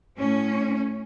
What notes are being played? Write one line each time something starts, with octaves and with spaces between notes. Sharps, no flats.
A2 C#4